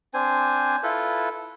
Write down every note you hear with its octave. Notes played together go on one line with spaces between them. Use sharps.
C4 D4 C5 G#5
E4 F4 A4 B4